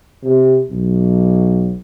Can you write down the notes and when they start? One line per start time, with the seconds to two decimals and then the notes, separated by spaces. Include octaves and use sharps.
0.23 C3
0.70 B1